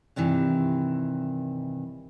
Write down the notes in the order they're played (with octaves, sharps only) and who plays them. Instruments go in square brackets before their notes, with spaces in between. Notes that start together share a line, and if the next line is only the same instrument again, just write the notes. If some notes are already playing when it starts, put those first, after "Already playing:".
[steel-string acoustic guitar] G2 C3 D#3 E3